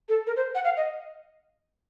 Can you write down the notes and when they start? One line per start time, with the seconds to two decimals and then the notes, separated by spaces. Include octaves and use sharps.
0.09 A4
0.27 A#4
0.36 C5
0.55 F#5
0.65 F5
0.77 D#5